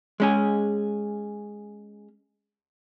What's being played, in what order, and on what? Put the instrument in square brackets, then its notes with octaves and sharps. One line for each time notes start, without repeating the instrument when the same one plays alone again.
[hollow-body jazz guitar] G#3 C#4 G#4